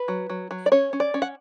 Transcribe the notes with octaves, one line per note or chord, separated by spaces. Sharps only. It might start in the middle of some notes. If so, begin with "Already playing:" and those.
Already playing: B4
F#3
F#3
F#3
D5
C#4 C#5
C#4
D5
C#4
F#5